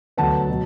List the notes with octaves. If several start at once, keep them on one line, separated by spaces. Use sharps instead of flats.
D2 D3 F#3 B3 F#5 A5
B2 F#3